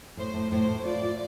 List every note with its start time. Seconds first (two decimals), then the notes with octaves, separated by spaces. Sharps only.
0.17 A2 C5
0.34 A2
0.51 A2 C5
0.68 A2
0.85 F4 D5
1.02 F4